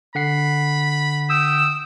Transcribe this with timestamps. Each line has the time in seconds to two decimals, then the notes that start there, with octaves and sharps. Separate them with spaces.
0.15 D3 F#5 B5 C7
1.30 G5 D#6 E6 E7